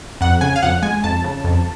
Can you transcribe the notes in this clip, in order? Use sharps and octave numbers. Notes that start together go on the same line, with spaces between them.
F2 F#5
C#3 G#5
F5
F2 F#5
G#3 G#5
F2 A5
C#3
F2